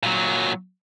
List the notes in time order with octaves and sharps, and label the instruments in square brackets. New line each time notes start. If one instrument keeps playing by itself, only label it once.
[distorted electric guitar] A#2 F#3